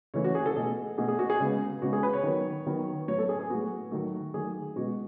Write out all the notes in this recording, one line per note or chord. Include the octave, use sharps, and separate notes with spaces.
C#3 E3 A3 C#5
F#4
G#4
A4
B2 A3 G#4
B2 A3 G#4
G#4
F#4
G#4
C#3 G#3 B3
C#3 G#3 B3 F#4
G#4
B4
C#5
D#3 F#3 B3
D#3 F#3 B3
A2 F#3 B3 C#5
A4
G#4
G#4
A2 F#3 B3 F#4
D#3 F#3 A3
D#3 F#3 A3 G#4
B2 G#3 B3 F#4